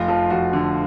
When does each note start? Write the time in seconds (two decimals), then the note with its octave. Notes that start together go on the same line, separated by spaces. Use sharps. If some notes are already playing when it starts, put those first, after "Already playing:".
Already playing: F1 F4
0.08 F3
0.30 F3 F#4
0.53 D3